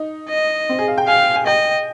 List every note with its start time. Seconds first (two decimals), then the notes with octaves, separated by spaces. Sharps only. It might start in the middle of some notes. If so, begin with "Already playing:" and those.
Already playing: D#4
0.29 D#5
0.69 C4
0.79 G#4
0.88 F5
0.98 G5
1.08 F5 G#5
1.36 G#5
1.46 D#5 G5